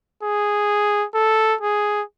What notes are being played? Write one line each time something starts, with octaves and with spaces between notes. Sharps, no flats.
G#4
A4
G#4